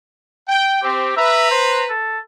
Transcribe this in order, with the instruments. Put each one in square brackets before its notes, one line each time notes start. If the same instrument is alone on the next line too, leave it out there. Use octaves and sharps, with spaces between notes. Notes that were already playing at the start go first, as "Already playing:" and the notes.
[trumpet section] G5
[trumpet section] C4 [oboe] G4
[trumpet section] B4 A#5 [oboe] E5
[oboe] C5
A4